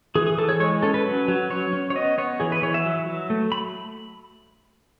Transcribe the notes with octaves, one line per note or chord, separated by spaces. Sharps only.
E3 G#4
G#4
E3 A4
C#5
G#3 C#5
C#4 A4
B4
F#3
F#3
C#4 C#5
C#4
C#5
B3 D#5
B3 C#5
E3 G#4
B4
E3 C#5
E5
F#3
F#3
A3
B5